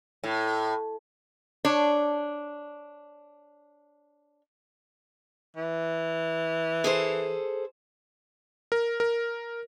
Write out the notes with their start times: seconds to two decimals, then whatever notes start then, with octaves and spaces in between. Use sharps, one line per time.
0.24 A2
1.65 D4 C#5
5.57 E3
6.84 G#4 A4 C5
8.72 A#4
9.00 A#4